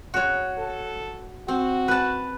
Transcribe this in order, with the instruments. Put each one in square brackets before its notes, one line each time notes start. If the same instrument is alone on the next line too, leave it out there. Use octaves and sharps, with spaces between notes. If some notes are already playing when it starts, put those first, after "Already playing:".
[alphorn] C#3 [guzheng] F#4 C#5
[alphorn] A4
[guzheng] C4 [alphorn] F#4
[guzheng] B4 A5